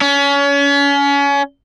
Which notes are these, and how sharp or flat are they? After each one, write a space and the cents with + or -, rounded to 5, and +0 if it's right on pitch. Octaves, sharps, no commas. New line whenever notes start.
C#4 +30